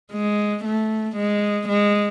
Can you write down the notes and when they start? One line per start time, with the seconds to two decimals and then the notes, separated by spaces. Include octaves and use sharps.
0.12 G#3
0.65 A3
1.16 G#3
1.69 G#3